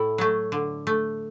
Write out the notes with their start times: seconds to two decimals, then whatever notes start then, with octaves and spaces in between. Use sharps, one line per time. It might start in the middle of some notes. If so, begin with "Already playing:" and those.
Already playing: A2 E4 A4
0.18 F#3 A3
0.52 D3
0.87 A3